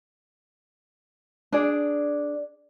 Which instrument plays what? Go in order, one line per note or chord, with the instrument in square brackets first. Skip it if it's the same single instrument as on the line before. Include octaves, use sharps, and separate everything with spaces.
[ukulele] D4 G#4 D5